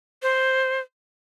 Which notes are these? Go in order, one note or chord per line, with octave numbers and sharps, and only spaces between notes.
C5